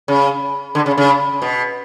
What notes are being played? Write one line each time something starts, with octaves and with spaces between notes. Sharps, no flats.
C#3
D3
C#3
C#3
B2